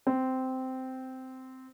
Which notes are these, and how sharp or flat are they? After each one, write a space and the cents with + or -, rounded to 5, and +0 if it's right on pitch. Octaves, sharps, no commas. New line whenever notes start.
C4 -10